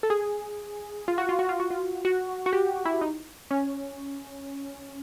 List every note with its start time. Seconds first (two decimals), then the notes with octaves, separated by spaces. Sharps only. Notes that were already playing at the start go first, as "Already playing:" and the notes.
0.03 A4
0.10 G#4
1.08 F4
1.18 F#4
1.29 F4
1.39 F#4
1.49 F4
1.60 F#4
1.70 F4
2.05 F#4
2.46 F#4
2.53 G4
2.85 E4
3.01 D#4
3.51 C#4